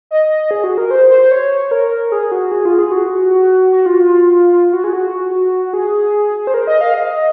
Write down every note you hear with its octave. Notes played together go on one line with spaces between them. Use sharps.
D#5
G#4
F#4
A#4
C5
C5
C#5
A#4
G#4
F#4
G#4
F4
G#4
F#4
F#4
F4
F4
F4
F#4
G#4
F#4
G#4
C5
A#4
D#5
F5
D#5